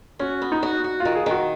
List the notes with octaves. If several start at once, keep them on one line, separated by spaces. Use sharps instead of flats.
C#4 F#4
B3
D#4
F#4
F#4
F4
D#3
G#4
D#3 F#4